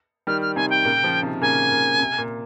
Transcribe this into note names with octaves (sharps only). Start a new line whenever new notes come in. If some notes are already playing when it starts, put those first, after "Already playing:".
D#3 G3 F6
F6
C3 D#3 G#5
G5
A#2 C#3
C#3 F3
C3 D#3
A#2 C#3 G#5
A#2
C3
A#2